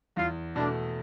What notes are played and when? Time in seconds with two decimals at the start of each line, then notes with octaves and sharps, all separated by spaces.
0.17 E2 F4
0.56 B2 A3 D4